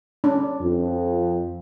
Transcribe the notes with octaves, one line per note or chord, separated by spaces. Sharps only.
C#4 D4
F2